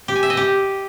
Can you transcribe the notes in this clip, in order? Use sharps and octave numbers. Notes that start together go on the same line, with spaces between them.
G4
G#5
E5
D#5
G4